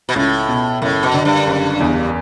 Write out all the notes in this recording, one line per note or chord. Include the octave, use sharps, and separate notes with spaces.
B2
C#2 A2
B2
F#1 A2
B2
D3
G2
F#1
E2